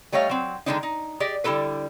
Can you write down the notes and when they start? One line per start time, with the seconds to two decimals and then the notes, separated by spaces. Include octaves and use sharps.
0.12 G3 A3 C#5 D#5 F5
0.29 F#3 C4
0.66 D3 D#3 G#3 C4 D4 D#4
0.83 D#4
1.20 G4 G#4 D5 D#5
1.44 D3 G3 E4 A4 B4